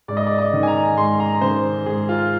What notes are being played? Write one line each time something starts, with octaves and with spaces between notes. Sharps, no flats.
G#2 D5
D#5
D5
D#5
D#3
G#5
A#5
G#2 C6
A#5
D#3 C5
G#2 G#4
F4